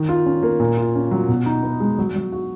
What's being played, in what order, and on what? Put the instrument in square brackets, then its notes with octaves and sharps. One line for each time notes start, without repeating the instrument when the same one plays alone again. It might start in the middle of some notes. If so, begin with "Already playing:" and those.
Already playing: [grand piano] D#3
F4
C#4
A#3
A#2
F4
C#4
F#3
B2
D#4
B3
G#3
F#3
F#3
F#4